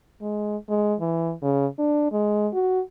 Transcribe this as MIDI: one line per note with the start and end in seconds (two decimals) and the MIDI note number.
0.22 0.57 56
0.69 0.95 56
1.01 1.33 52
1.42 1.67 49
1.79 2.07 62
2.12 2.48 56
2.54 2.81 66